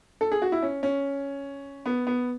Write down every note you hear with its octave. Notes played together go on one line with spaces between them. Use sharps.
A4
G#4
F#4
E4
C#4
C#4
B3
B3